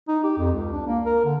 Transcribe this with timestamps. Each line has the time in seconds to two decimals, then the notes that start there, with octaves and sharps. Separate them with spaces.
0.08 D#4
0.24 G4
0.38 F2
0.53 C#2
0.73 D4
0.87 A#3
1.06 A#4
1.25 D3